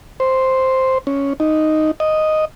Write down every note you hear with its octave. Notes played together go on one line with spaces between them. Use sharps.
C5
C#4
D#4
D#5